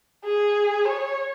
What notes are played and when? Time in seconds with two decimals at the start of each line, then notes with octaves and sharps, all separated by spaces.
0.25 G#4
0.85 C#5